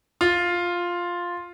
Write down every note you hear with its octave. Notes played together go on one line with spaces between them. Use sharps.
F4